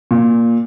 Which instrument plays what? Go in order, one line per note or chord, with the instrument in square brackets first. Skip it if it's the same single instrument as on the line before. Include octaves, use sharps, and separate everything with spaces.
[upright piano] A#2